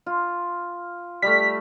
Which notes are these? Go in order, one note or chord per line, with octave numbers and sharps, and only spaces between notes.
F4
G3 A3 B6